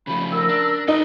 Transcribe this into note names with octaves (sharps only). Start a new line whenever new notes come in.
C#3 F3 A3 B5
A#4 E6
D4
D#4 A4 B4